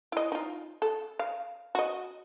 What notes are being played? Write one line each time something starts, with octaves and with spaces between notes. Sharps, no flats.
E4 D#5
D#4 F4
A4
F5
F#4 D#5